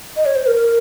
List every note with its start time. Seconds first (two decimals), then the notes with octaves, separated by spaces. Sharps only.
0.17 D#5
0.26 C#5
0.35 C5
0.47 A#4